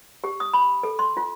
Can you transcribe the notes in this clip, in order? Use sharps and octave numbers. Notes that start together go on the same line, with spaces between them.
G4
D#6
B5
A4
C6
F4